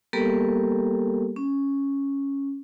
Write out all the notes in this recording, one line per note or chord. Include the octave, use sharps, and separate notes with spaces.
G3 A#3 B3 G4 A4 A#4
C#4